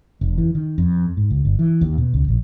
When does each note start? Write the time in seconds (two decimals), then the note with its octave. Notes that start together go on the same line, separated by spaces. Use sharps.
0.21 F1
0.38 E3
0.55 D#3
0.78 F2
1.17 G#2
1.31 C#2
1.45 G1
1.59 E3
1.81 D#2
1.98 B2
2.14 C#2
2.28 A#1